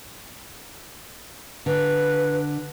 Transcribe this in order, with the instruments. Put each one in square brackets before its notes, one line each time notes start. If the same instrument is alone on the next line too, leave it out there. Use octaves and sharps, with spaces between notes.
[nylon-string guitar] D3 [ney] B4